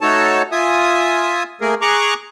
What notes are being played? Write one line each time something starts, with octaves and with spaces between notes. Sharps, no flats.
A3 D#4 F#4 A4 C#5 A5
F4 E5 G#5 D#6
A3 A#3 G#4 A#4
G#4 A#5 C#6 D6 F#6